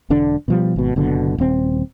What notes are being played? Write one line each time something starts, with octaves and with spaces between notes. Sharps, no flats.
E1 D3 D4
B2 F3 G3
G#1 B2
F#1 B2 D3
D#1 C4